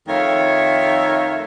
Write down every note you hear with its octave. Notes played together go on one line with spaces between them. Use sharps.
F2 D#3 A3 C#5 E5 F5